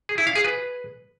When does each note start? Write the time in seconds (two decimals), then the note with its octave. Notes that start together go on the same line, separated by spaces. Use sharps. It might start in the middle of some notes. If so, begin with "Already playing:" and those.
0.09 G#4
0.18 E4
0.27 F5
0.36 G#4
0.44 B4